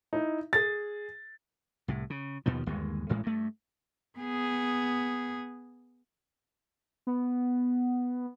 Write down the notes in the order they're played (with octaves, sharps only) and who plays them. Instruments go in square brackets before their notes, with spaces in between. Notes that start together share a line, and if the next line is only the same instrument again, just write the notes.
[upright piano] D#4 E4
G#4 A6
[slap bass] C2 A2
C#3
D#2 B2 D#3 F3
G1 D#2 G#3
A1 A2 G#3
G2 A3
[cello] B3 G#4
[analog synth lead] B3